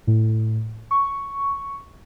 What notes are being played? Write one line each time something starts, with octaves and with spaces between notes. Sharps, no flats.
A2
C#6